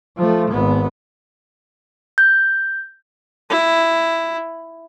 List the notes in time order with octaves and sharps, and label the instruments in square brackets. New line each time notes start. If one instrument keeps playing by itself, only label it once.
[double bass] F3 A3
G#1 B3
[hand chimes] G6
[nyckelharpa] E4